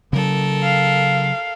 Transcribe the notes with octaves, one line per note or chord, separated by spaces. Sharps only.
C#3 F#3 A4 A#4
F5